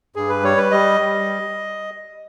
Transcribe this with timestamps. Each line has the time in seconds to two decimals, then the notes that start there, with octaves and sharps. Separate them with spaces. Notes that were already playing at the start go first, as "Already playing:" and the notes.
0.16 G2 G#4
0.29 B4
0.43 G3 C#5
0.58 B4
0.71 G3 D#5
1.01 G3